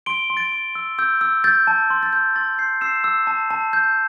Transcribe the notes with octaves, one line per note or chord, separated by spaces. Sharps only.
C6 D7 G7
C6
A6 D7
C6
E6
E6 G6
E6
G6 A6
A5
C6
A6
G6
C6 A6
C6 G6 C7
E6 C7 E7
E6
A5
A5
G6